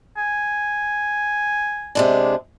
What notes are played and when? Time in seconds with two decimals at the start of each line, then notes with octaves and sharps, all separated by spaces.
0.18 G#5
1.95 C3 G#3 D4